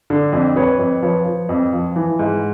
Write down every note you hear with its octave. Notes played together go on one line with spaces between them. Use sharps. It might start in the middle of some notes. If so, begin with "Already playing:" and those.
D3
F2
F2 B4 C#5
F2
F3 B4 C#5
F3
F2
F3
E3
G#2